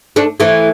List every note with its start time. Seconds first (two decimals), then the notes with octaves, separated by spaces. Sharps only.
0.16 A3 D4
0.40 E3 A3